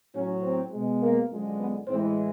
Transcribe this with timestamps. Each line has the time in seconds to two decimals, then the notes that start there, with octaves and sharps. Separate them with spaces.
0.14 A2 F#3 C#4
0.43 C4
0.71 B2 G#3
1.01 A#3
1.30 F#2 D3 F3 G#3
1.59 B3
1.87 A2 E3 G#3 C4